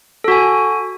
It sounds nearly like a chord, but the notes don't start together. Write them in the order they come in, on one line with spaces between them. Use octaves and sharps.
A4 F#4 G#5